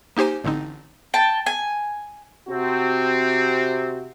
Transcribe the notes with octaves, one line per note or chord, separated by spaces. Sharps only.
A#3 D#4 G4 C5 G#5
A1 D3 C4 D#4
G5 A5
G#5
C3 C4 F#4